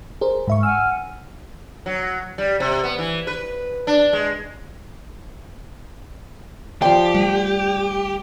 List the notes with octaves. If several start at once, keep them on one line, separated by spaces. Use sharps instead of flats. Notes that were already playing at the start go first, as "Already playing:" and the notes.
G#4 A#4 C5
G#2 E5 C#6
F#5 G#5 E6 F6
F#3
G3
C3
B3
E3
B4
D4
G#3
F3 G4 D5 G5 C6
G3 A3 F#5